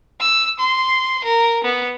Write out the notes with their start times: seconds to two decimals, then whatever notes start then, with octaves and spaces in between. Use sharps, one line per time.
0.21 E6
0.59 C6
1.24 A#4
1.64 B3